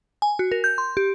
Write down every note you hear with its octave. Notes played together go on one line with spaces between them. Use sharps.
G#5
F#4
A#4
G6
C6
G4